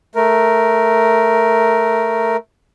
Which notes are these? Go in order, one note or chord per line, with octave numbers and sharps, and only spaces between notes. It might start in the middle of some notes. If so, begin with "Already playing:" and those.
A3 A#4